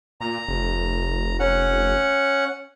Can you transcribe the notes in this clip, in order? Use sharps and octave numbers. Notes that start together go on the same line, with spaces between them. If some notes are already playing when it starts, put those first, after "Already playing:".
A#2 A#5
F1
C#4 F#5